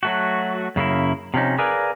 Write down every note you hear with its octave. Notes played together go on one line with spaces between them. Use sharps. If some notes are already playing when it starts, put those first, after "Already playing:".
F#3 A3 F#4
F#2 C#3 A#3 E4
C3 F3 C#4 D#4
G#4 A#4 B4 D5 F5 G#5